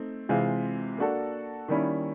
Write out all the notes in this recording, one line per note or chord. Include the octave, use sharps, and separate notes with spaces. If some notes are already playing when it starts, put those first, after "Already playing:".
Already playing: A3 C4 D#4
C3 E3 G#3 C4 F4
A#3 D4 F#4 A4
D#3 G3 A#3 C#4 E4